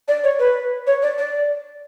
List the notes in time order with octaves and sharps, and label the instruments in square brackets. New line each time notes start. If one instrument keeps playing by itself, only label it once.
[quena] D5
C#5
B4
C#5
D5
D5